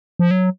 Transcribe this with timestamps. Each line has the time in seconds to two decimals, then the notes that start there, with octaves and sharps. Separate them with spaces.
0.19 F3
0.31 F#3